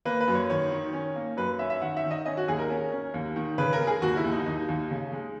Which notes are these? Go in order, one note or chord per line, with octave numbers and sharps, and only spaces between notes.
A#3 B4
B4
F#2
C#5
D#3 C#5
D#3
C#4
A#3
F#2 B4
C#4 E5
E5
D#3 F#5
E5
D#3
D#5
C#4 D#5
F#4
D#2 G#4
A#4
C#4
C#4
D#2
D#3
C#3 B4
A#4
G#3
G#4
D#2 F#4
E4
D#2
D#4
D#2 D#4
D#2
C#3
G#3